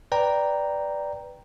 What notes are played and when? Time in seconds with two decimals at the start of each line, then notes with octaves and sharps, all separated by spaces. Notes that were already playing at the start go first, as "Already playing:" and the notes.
0.12 B4 D5 G5 A#5